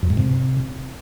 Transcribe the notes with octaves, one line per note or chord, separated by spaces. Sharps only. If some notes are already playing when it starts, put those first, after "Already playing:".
F#2
G#2
C3